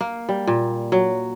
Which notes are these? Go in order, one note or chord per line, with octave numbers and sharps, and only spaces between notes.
A#3
G3
A#2
F#3